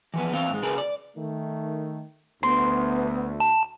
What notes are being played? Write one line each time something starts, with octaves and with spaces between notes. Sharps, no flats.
E3 F3 B3
E2 E3 C4 F5 G5
G#2 G#3
C#3 F4 G#4 A#4 B4
D5
D#3 A3
D2 B3 C6
A5